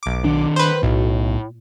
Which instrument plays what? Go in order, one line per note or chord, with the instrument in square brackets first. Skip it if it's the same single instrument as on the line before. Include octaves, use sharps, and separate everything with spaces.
[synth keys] B1 D6
[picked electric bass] D#3 D4
[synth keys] B4 C5
[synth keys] B1 [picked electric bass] A2